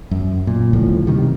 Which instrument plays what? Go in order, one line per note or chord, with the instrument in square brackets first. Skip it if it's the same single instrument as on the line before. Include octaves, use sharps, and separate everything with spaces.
[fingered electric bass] F#2
A#2
D1 C#2 A2 F3
C3 D#3 G3